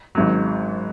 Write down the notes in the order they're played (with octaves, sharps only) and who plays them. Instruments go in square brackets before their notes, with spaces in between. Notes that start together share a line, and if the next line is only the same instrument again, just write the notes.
[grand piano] G#1 G#2 F#3